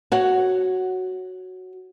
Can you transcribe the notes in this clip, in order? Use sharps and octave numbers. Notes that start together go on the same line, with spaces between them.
F#4 C#5 F#5